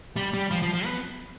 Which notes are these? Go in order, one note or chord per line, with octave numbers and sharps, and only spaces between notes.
G3
G3
F3
F3
F3
B3